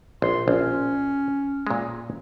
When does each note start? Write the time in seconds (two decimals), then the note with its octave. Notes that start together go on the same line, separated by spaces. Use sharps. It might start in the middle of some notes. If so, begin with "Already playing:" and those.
0.22 A#1 C6
0.48 A#1 C#4
1.67 A#2 G#3